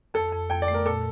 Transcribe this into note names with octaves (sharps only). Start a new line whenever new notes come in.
F2 A4
F2
F2 G5
D5
A3
A#4
A#2 A4